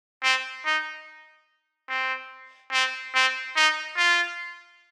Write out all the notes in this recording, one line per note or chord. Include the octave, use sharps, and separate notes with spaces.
C4
D#4
C4
C4
C4
D#4
F4